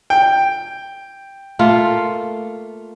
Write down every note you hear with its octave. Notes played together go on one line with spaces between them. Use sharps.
G5
A3 A#3 F4